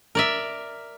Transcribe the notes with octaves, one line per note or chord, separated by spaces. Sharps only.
A#4 D5 E5